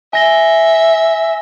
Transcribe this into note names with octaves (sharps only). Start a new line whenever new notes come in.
E5 G#5 A#6 G7